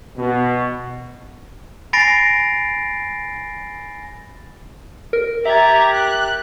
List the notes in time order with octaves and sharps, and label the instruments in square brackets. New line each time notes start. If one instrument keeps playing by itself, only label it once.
[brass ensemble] B2
[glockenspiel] G#5 B5 A6 A#6 C7 D7
[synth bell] A#4
[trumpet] G4 [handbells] E5 A6 [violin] A#5 G#6
[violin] F#6